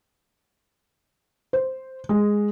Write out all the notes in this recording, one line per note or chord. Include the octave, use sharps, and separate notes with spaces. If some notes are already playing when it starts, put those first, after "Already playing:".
C5
G#3